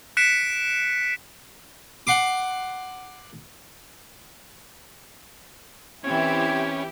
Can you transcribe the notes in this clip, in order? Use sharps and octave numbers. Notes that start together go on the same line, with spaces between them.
F#6 B6 C#7 D7 E7
F#5 C6 D6
E3 C4 C#4 E4 G4 G#6